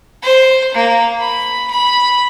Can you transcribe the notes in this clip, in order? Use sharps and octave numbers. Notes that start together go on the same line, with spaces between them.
C5
A#3
B5
B5